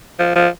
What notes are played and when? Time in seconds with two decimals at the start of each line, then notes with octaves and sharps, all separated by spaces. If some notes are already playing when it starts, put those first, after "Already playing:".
0.19 F3
0.36 F3